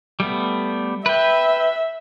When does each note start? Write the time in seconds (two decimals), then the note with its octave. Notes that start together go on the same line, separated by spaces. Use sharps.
0.20 G3 A3 B3
1.06 B4 E5 G5